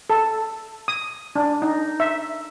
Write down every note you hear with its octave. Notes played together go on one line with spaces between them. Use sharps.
A4
D#6
D4
D#4
E5